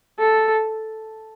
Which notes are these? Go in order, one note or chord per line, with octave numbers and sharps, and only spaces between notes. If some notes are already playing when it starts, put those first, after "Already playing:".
A4